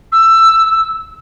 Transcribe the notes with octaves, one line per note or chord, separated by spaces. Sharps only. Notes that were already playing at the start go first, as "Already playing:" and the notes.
E6